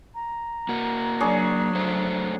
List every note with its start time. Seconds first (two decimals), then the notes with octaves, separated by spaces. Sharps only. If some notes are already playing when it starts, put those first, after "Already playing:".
0.15 A#5
0.69 A#3 F#4
1.20 F#3 D4 G#4 C#5
1.75 F#2 A3 C5